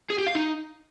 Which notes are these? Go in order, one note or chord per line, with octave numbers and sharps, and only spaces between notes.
G#4
G4
F5
D#4